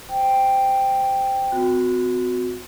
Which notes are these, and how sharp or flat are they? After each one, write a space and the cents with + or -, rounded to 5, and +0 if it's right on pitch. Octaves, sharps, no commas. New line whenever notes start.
C5 -10 G5 +0
C4 -45 F#4 -20